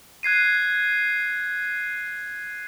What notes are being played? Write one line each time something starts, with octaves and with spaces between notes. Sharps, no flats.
F#6 G#6 C7 D#7